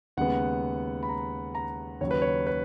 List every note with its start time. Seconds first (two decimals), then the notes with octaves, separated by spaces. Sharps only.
0.17 D#2 C#3 G#3 B3 F#5
1.03 B5
1.09 A#5
1.55 A#5
2.01 D#2 C#3 F#3 C#5
2.11 B4
2.22 C#5
2.47 B4